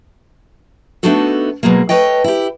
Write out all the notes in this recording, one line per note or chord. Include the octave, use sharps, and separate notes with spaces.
A3 B3 D4 D#4 F#4 A4
B2 F3 F#3 G#3 A#3
A3 B4 C#5 D#5 G5
E4 G4